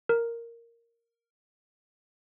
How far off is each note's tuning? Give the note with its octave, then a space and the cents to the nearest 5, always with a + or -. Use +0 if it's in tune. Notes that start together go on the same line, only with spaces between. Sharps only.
A#4 -5